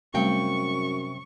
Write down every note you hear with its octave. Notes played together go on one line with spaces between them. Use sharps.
F#2 C3 G3 A3 C4 F5 G5 C#6